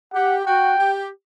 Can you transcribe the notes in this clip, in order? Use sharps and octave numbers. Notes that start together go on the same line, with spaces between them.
G4 F#5
F#4 G5
G4